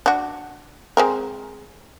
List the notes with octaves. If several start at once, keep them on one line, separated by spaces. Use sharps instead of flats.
D4 F#4
G#3 C4 A#4